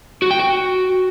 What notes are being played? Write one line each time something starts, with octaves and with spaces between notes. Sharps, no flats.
F#4
G5
F#4